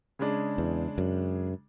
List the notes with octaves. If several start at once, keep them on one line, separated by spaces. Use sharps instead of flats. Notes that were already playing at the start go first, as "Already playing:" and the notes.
C#3 G#3 D4
E2
F#2